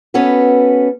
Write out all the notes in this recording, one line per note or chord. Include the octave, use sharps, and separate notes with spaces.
B3 C#4 F#4 A4 B4